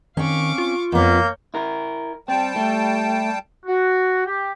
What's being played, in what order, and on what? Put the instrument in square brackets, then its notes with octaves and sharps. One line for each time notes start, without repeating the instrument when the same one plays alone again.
[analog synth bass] D#3 [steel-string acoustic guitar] C4 C#4 [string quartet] F5 C#6 D6
[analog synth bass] F4
[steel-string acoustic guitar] F2 B3 [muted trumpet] A#3 [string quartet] C#5 G6
[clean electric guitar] E4 A#4
[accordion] G3 G5 A5 [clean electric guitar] C4
[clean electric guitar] A3
[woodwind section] F#4
G4